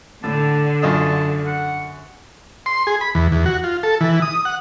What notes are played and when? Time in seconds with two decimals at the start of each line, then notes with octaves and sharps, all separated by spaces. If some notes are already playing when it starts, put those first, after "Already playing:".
0.24 A2 D3 A5
0.83 F#2 F4 D#5 A5
1.47 F#5
2.66 C6
2.87 G#4
3.01 B5
3.15 E2
3.32 E2
3.46 F#4
3.64 F4
3.83 A4
4.01 E3
4.22 D#6
4.45 F#5